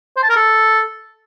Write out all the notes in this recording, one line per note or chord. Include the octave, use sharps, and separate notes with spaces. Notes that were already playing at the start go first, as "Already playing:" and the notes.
C5
A5
A#4
A4